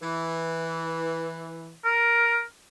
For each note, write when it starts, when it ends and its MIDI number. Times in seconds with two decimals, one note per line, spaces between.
0.02 1.76 52
1.85 2.42 70